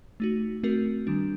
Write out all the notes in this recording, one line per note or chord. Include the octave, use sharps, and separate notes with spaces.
A3 D#4 F#4
A3 C4 F#4 A#4
D#3 G3 D4